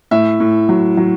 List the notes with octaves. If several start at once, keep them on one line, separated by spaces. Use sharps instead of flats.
A2 E5
A2
F#3
F#3